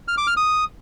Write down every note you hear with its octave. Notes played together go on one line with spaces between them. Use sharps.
F6
D6
F6
D#6